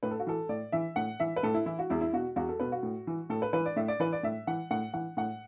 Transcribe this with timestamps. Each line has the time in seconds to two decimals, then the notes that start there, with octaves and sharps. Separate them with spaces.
0.03 A2 B4
0.11 A4
0.20 F#4
0.27 E3 A4
0.49 A2 D5
0.72 E3 E5
0.96 A2 F#5
1.20 E3 E5
1.36 B4
1.43 A2 A4
1.54 E4
1.66 E3 E4
1.79 F#4
1.90 E2 E4
2.01 E4
2.13 B2 F#4
2.36 E2 F#4
2.49 A4
2.60 B2 B4
2.72 F#4
2.83 A2
3.07 E3
3.30 A2 A4
3.42 B4
3.53 E3 B4
3.66 D5
3.76 A2 E5
3.88 D5
4.00 E3 B4
4.13 D5
4.23 A2 E5
4.47 E3 F#5
4.71 A2 F#5
4.94 E3 F#5
5.17 A2 F#5